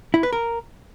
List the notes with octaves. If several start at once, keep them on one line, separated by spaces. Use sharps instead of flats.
E4
B4
A#4